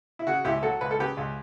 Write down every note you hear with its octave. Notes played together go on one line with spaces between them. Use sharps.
E4
C#3 F#4
C#2 E4 G4
F#3 F#4 A4
C#2 B4
A4
C#3 G4 B4
C#2